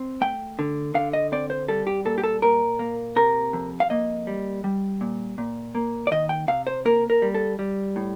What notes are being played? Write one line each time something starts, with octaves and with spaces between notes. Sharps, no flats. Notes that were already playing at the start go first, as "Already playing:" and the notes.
Already playing: C4
A3 G5
D3
D3 F5
D#5
C4 D5
C5
G3 A4
G4
A#2 A4
G4
A4
A#2 A#4
A#3
C3 A#4
F2
F5
A#3 D#5
G3
G3
A#2
A#2
A#3
D5
D#3 D#5
G5
C3 F5
C5
A#3 A#4
A#4
G3
A4
G3
A2